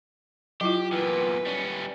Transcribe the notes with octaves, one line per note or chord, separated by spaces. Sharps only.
F#3 E4 F4 G4
E2 A#2 B4
G3 C#4